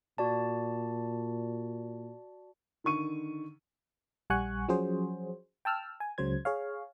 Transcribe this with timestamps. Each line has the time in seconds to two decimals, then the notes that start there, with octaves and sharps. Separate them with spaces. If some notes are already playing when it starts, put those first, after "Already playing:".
0.18 A#2 F#4 D5 A5
2.84 D3 D#3 C#6 D#7
4.30 A#1 G3 F#5 G#5 C#6 F#6
4.68 F3 F#3 C#4 F#4 G#4 C5
5.65 G5 A5 E6 F6
6.00 G#5
6.18 C#2 C#3 F#3 C5 G#6
6.45 G#4 C#5 F5